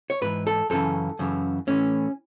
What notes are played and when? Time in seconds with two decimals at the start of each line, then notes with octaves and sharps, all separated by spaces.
0.10 C#5
0.22 G#2 E3 B4
0.47 A4
0.70 F#2 C#3 E3 A4
1.19 F#2 C#3 E3
1.67 A2 E3 C#4